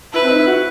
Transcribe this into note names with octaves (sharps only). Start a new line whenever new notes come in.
E4 B4
C4
D#4
E4
F#4